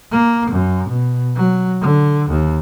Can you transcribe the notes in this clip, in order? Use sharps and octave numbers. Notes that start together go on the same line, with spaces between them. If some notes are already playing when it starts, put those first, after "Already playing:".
A#3
F#2
B2
F#3
D3
D#2